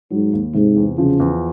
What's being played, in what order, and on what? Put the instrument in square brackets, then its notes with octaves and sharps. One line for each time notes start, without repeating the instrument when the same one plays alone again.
[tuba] G#2 [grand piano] F#3
[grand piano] D#2
[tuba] G#2 [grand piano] C3
[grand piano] E2
[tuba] C#3 [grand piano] F3
[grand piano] E2